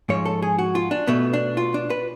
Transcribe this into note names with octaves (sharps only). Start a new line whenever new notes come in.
G#2 F3 G#3 C#5
A4
G#4
F#4
F4
D4
B2 A3 B3
D4
F4
D4
B4